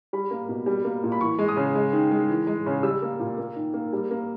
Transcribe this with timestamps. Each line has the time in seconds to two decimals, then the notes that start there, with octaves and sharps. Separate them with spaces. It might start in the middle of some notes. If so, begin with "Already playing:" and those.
0.13 G3 B5
0.31 A#3
0.49 B2
0.66 G3
0.84 A#3
1.04 A#2
1.12 B5
1.21 E3 C#6
1.39 G#3
1.48 D#6
1.57 C#3
1.75 G#3
1.93 D#3
2.12 G#3
2.29 E3
2.47 G#3
2.66 C#3
2.83 G3 E6
3.02 A#3
3.20 A#2
3.38 A#3
3.56 D#3
3.74 A#3
3.93 G3
4.11 A#3